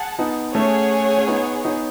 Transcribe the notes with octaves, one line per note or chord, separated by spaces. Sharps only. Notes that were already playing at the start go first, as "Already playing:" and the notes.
Already playing: G#4 F#5 A5
B3 D#4
A3 C#4 G#4 C#5 F#5
C#4
B3 D#4
B3 D#4